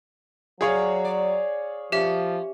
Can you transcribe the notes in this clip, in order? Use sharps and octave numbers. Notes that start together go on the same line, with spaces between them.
F#3 G#4 C#5 D5 F5
D5
F3 C#4 G4 E5